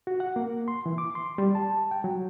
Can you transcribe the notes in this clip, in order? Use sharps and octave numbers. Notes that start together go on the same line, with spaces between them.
F#4
F#5
A#3
C6
E3
D6
C6
G3
A5
G5
F#3